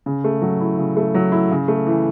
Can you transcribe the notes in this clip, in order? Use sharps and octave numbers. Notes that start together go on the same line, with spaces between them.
C#3
A3
F#3
E4
C#3
A3
F#3
E4
C#3
A3
E3